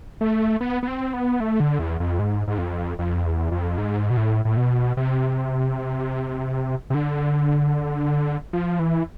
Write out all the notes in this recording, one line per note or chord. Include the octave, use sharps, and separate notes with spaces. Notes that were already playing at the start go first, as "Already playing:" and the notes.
A3
B3
B3
C4
B3
A3
D3
E2
F2
G#2
G#2
F2
F2
E2
F2
G#2
B2
A2
A2
B2
C3
C3
D3
F3
E3